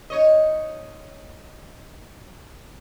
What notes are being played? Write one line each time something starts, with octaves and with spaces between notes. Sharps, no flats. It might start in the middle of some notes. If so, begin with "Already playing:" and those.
D#4 C#5 D#5